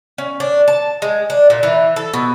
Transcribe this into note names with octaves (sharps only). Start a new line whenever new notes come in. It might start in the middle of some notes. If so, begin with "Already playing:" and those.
C#4
D4
A5
G#3
D4
A#2
E3
A4
B2